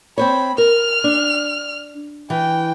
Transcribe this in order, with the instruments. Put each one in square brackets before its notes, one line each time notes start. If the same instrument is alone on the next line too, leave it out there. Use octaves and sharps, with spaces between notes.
[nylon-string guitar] C4 C5 C#5 [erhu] B5
[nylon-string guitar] A#4 [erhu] F6
[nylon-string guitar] D4
[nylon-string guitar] E3 [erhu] G5